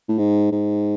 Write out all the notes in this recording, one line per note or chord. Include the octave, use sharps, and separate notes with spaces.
A2
G#2
G#2